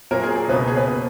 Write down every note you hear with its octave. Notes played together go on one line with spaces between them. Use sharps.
A#2 F#3 A#3 A#4
G#4
G#4
C#2 B2 A#3 B4
G#4
B4
B2 A#3